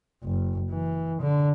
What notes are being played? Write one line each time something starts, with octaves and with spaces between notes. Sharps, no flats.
F#1
E3
D3